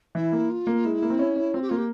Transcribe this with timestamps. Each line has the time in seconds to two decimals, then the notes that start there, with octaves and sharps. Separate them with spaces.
0.15 E3 E4
0.32 A#3
0.49 F4
0.67 A#3
0.84 G#3 E4
1.02 A#3
1.10 C4
1.19 C#4
1.36 C#4
1.53 C4 F4
1.61 G4
1.69 A#3 F4
1.77 G4